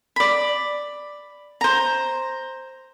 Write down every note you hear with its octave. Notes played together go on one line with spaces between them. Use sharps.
D5 B5
C5 A#5